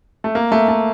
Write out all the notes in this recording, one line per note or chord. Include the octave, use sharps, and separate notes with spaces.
A3
A#3
A3
A3